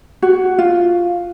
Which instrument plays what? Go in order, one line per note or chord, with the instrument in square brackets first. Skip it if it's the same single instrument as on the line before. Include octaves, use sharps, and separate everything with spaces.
[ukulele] F#4
F4